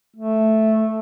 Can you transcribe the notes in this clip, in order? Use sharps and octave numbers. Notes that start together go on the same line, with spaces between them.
A3